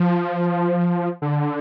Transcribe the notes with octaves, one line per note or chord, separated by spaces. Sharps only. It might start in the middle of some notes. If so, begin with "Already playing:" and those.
Already playing: F3
D3